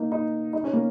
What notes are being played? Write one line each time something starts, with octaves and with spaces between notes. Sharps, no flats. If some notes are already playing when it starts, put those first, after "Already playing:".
Already playing: A#3 D#4
D#4
D#4
C#4
A#3